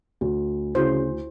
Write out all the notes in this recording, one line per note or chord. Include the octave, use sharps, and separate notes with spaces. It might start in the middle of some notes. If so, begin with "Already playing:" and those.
D2
C#3 E4 F#4 C5